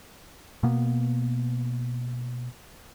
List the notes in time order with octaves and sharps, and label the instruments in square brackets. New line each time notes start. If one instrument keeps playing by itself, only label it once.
[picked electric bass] B2 A#3 B3